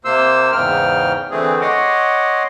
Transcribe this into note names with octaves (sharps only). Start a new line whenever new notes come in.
C3 A#3 C5 C6 E6
E2 G#2 C#3 G5 F6
D3 E3 A3 C4 G#4
C#5 D#5 F#5 C6 D6